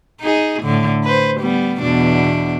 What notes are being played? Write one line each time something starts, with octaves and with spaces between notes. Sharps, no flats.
D#4 G#4
A2 D3
B4 C5
G3 B3
E2 B2 D4